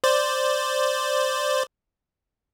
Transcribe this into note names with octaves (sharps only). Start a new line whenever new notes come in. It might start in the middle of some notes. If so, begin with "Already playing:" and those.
C5 D5